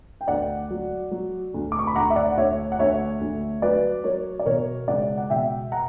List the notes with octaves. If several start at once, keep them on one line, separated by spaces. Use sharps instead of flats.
G5
D2 D5 F#5
F#3
F#3
D2
D6
C#6
B5
D2 F#5 A#5
E5
D5 F#5
F#5
D2 C#5 E5
F#5
D2 C#5 E5
D2
F#3 B4 D5
F#3 A#4 C#5
D5
B2 A#4 C#5
C#2 D5 F#5
F#5
B2 E5 G5
F#5 A#5